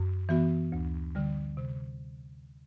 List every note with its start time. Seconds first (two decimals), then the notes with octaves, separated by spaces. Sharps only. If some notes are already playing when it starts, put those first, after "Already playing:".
Already playing: F#2
0.29 E3 B3 F#4
0.72 D2
1.15 D3 G3
1.57 C3